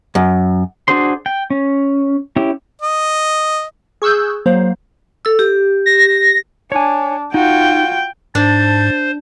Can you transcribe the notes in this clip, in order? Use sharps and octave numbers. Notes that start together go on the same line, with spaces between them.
F#2
D4 F#4 G#4 C5 C6
G5
C#4
C#4 E4 G4
D#5
G#4 C#6 E6 F#6 G6
F#3 A#3 C5
A4 E6
G4
A#6
D4 C#5 G#5
D#4 F4 F#4 G5
G#2 D4 C5 A5